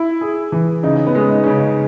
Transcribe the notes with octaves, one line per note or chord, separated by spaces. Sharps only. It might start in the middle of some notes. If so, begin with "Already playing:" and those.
Already playing: E4
G#4
E3
C#3 D#4
C#4
B3
G#3 C#4
D#4
C#3 C#4
D#4